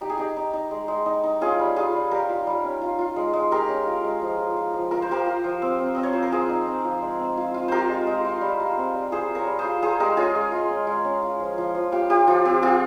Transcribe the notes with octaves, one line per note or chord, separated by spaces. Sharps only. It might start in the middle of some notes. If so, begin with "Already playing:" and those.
D#4 G4
G#4
D#4 G4
D#4
D#4
G#3
G#3
D#4
D#4
C#4 F4 G#4
G3
G3 F4 G#4
G3
G3 G4 A#4
F4
G3
C#4
F4
F4
G#3
G#3
G#3 G4 A#4
C#4
F4
G#3
F3
F3
F4
F3
F4 A#4
C5
F3 G4 A#4
F4
F3
C4
C4
C4 D#5
C#5
F3 C5
A#4
C4 F4 G#4
D#4
C4
F3
G#3
C4
F4
F4
F4 G4 A#4 C5
G#3
G#3
F4
G3
F4
C4
G3
F4 G#4 C5
F4
A#4 C#5
G3
G#4 C5
F4
F4 G#4 C5
G#3 G4 A#4
C#4 F4 G#4
G#3
F4
C#4
G#3
C#4
F4
F3
F3
F3
F4 G4
F4 G4
F3 F4
C4 G4
C4 F4 G#4